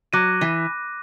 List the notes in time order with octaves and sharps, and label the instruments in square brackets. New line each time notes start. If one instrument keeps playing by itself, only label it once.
[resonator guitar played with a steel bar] F#3 [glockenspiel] D6 F#6 A#6 D#7
[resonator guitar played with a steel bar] E3